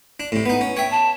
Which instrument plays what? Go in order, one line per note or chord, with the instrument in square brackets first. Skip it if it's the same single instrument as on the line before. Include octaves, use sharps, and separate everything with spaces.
[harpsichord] D4
A2 C3
B3 D#4
C#4
[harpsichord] C#5 E5 [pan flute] G5
[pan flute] A5